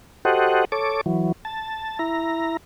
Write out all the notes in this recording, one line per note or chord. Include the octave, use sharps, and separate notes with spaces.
F#4 G4 A4 C5 D#5 F#5
A4 C#5 D6
E3 F#3
A5
E4 A#5